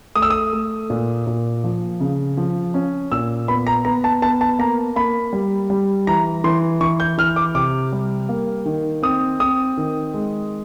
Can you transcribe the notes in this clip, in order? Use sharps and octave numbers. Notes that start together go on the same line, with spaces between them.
A3 D#6
E6
D#6
A3
A#2
A#2
F3
C#3
F3
C#4
A#2 E6
B3 B5
A#5
B3 A#5
A5
B3 A5
A5
A#3 A#5
A#3 B5
G3
G3
E3 A#5
E3 C6
E3 C#6
G6
E3 F6
D6
C3 D6
G3
A#3
D#3
C4 D#6
C4 D#6
D#3
G#3